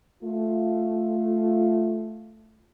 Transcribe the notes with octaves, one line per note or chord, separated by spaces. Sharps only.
A3 F4